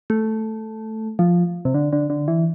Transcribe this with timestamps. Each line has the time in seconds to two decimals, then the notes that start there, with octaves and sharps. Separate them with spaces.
0.10 A3
1.19 F3
1.65 C3
1.74 D3
1.93 D3
2.10 D3
2.28 E3